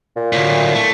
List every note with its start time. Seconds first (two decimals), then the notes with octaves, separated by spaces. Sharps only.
0.16 A#2
0.32 D2 A2
0.75 A3